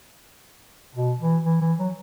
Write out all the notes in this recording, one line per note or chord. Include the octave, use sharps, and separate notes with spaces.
B2
E3
E3
E3
F#3